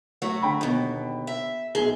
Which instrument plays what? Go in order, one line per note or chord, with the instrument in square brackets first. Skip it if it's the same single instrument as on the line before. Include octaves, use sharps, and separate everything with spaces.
[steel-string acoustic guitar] F#3 A3 F#4
[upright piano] D3 G5 B5
[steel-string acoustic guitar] D#2 B2
E5
[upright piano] B1 G#5 G7 [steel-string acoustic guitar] G#4